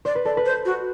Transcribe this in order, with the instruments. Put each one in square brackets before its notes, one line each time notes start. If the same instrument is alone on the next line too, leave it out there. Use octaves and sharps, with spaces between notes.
[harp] C5 [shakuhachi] D5
[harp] B4
[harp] A4 [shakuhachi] D5
[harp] B4
[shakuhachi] C5
F#4